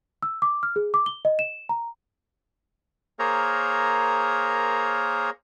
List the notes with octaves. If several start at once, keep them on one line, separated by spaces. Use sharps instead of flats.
E6
D6
F6
G#4
D6
G7
D#5
E7
A#5
A#3 G#4 A#4 C5 C#5 A#5